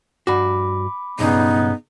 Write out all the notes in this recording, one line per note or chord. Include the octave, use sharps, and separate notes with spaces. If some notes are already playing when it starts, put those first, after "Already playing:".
G2 F#4 B5 D6
B1 G2 C#3 B3 D#4